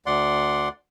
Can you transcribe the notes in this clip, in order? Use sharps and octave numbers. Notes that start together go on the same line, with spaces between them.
D2 D5 F#5 C6